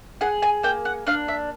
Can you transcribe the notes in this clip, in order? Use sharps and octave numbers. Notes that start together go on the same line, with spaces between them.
G#4 F#5
G#5
A#3 G5
F#5
D4 F5
E5